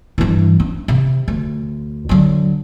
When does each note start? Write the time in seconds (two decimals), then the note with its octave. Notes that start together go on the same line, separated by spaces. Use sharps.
0.18 G2 E3
0.60 C#4
0.88 C3
1.28 D2
2.09 D3 F#3